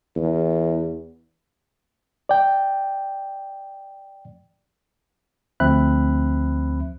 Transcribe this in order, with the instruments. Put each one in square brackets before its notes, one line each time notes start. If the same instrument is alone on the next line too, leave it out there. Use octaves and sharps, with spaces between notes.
[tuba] E2
[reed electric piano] D5 G5
[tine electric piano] D2 F3 C4 E5 B5 F#6